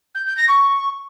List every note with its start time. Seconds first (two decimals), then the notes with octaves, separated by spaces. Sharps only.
0.14 G6
0.26 G6
0.37 A#6
0.48 C#6